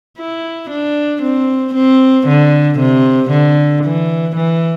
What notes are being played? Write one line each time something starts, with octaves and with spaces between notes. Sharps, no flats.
E4
D4
C4
C4
D3
C3
D3
E3
E3